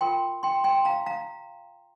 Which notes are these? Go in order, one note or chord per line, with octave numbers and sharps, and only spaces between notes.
F4 A#4 G5 C6
G5 C6
G5 C6
F5 A#5
F5 A#5